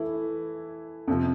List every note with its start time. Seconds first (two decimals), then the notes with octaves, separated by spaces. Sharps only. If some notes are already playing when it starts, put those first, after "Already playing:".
Already playing: E3 A3 E4
1.08 F2 C3 F3